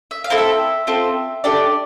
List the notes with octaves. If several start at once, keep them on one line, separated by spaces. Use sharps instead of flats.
E5
F5
C4 E4 A4
E5
C4 F4 A4
A3 D4 G4 D5